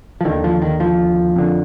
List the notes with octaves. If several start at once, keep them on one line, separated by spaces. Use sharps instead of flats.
F3
D#2 D3 D#3
F3
D#3
F3
F2 D3